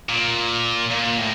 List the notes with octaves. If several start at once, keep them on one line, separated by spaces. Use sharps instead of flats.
A#2
A#2
A2